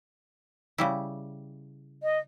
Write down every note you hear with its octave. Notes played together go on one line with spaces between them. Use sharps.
C#3 G3 E4
D#5